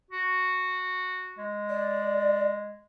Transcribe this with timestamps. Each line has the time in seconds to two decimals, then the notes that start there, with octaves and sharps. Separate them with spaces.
0.11 F#4
1.39 G#3
1.69 D5